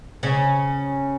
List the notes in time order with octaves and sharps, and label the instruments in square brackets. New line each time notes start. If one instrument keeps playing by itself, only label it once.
[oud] C#3 C#4